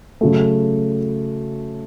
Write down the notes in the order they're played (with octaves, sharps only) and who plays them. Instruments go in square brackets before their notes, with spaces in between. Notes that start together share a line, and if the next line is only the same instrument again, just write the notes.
[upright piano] C#3 F#3 A3